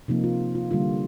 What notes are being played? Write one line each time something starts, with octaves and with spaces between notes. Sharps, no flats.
C3 F3 A#3 D#4
F4
F4
D3 G3 A#3 F4